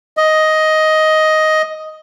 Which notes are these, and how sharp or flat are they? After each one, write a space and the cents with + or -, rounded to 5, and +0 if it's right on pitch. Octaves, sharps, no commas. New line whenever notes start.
D#5 +10